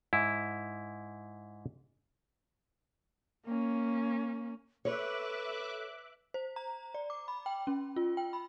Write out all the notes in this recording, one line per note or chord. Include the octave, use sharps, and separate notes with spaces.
G#2 E4
A#3 C#4
A4 B4 C#5 E5 D6 F#6
C5
A#5
D5
D6
B5
G5
C#4
F4
G5
B5